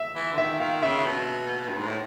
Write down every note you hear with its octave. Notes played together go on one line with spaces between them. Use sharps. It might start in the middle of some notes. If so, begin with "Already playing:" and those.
Already playing: E5
E3
D3
D#3 E5
D#3 F5
C#3 E5
B2
G2
G#2
A2